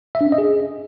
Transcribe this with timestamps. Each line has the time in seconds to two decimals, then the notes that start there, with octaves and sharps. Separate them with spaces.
0.15 E5
0.21 D4
0.26 C#4
0.32 D#5
0.38 G#4